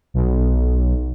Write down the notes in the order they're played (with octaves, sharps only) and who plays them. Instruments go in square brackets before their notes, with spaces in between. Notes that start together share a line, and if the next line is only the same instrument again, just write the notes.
[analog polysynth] B1